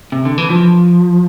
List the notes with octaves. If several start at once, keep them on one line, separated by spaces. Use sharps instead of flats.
C3
D3
E3
F3